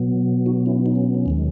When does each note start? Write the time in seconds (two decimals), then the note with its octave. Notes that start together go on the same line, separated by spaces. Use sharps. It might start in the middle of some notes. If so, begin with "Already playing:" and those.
Already playing: B2 F#3 B3
0.46 D#4 F#4
0.66 C#4 E4
0.86 D#4
0.96 C#4
1.15 C#4
1.26 D#2 D#3 G#3